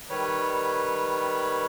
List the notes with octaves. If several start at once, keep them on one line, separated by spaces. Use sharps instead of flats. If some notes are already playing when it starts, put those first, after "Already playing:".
D#3 G3 B4 C#5